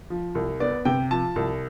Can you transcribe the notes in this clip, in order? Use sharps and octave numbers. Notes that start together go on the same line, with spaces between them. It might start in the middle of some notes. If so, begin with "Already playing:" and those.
F3
C2
B3 D5
C3 G5
F3 A5
C2